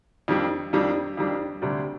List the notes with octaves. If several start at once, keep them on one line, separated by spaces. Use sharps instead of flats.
F2 D#3 G3 D4
F2 D#3 G3 D4
F2 D#3 G3 D4
D2 C3 G3 D4